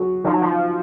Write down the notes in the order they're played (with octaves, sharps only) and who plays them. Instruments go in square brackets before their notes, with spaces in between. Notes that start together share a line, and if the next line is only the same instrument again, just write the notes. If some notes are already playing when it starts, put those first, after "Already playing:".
Already playing: [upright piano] F#3 F#4 G#4
[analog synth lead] F3 [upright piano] D#4
[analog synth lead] F#3
F3